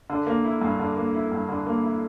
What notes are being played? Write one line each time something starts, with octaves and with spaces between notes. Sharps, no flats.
D3
A#3
E4
G2
D3
A#3
E4
G2
D3
A#3
E4